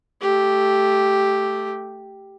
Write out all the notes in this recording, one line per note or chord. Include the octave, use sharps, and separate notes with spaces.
A3 G4